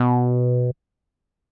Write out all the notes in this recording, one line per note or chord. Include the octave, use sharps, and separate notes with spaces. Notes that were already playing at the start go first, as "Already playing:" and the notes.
Already playing: B2